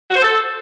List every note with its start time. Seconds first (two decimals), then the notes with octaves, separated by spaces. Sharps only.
0.10 F#4
0.16 C5
0.21 A4